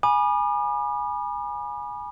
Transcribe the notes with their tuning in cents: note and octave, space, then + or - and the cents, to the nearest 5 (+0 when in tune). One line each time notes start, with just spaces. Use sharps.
G#5 +0 B5 -30 D6 +45